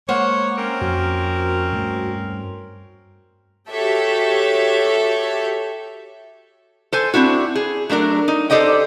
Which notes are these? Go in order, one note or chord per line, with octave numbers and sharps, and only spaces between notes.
G#3 A#3 C5 C#5 F#5
C4 C#4 A#4 A#5
F2 F#4
G2 A3
F#4 G4 A4 C#5 E5
A4 C5 G#5
C4 D4 E4 F#4
G#4
F#3 A3 D4 A#4
D#4
G4 A4 C5 D5 D#5 G5